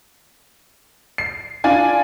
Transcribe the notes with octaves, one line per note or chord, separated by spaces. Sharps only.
C7
D4 F4 G#5